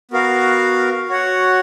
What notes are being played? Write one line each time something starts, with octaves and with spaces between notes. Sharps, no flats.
B3 F#4 A#4 F5
F#4 C#5 F#5